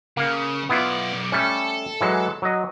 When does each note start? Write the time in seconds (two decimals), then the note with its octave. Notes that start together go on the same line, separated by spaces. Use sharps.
0.17 C#3 A#3 F5
0.69 B1 B3 E4 F4 D5
1.32 G3 A3 C#4 A4
2.01 E3 F#3 G#3
2.42 F#3 D#5